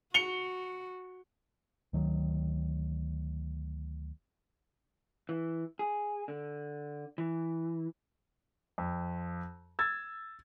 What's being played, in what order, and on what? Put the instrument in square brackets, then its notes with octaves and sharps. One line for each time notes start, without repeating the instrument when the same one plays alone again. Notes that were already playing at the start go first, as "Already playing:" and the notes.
[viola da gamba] F#4 [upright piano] C#7 F7 G7
[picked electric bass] D2 D#3 F#3
[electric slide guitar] E3
G#4
D3
E3
[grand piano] F2
E6 G#6 A6